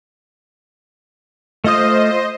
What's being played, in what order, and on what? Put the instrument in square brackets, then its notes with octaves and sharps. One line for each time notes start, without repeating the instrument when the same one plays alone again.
[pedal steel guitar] A3 F4 D#6 [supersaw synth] C5 D#5